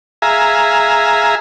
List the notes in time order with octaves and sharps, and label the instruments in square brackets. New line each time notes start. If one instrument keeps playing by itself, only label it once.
[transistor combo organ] G#4 E5 F5 G#5 A#5